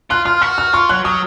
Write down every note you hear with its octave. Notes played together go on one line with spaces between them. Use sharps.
F4 F#6
F4 F6
F#4 F6
F6
F4 C#6
F#3 F#6
F#3 D#6